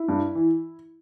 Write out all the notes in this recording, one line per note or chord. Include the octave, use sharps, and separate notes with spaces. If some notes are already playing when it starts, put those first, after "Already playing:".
Already playing: E4
G2
E3